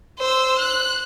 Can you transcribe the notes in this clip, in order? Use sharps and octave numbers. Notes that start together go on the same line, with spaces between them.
C5 E6
F#6